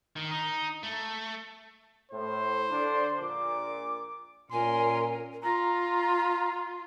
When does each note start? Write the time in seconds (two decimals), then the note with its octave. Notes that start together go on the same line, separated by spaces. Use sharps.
0.16 D#3
0.31 D#4
0.83 A3
2.11 A2 C5
2.70 D3 D4
3.19 A#1 A#2 D6
4.52 A#2 C#4 A#4 G#5 C6
5.43 F4 A#5